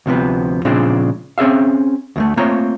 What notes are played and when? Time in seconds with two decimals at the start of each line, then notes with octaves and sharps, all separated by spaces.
0.06 D2 C3 F3 B3
0.65 A#2 C#3 F3 G#3 C4 D4
1.38 C4 C#4 G#4 E5 F5
2.16 D2 G#3 A3
2.37 A3 A#3 C4 F4 C#5 A#5